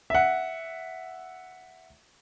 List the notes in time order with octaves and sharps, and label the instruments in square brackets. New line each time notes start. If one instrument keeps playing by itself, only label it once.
[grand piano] E5 F#5